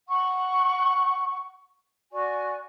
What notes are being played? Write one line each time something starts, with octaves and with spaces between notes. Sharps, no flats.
F#5 C#6
F#4 D5 G#5 C#6